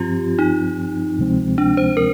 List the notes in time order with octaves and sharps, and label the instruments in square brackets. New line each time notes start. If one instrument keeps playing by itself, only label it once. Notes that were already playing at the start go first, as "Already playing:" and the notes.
Already playing: [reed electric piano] G2 F3 C4 [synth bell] F4 G4
[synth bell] D#4
[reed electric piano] D2 C3 F3 G#3 C4
[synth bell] D4
C5
A#4